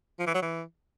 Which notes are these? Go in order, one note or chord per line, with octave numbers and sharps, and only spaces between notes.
F3
E3
F#3
E3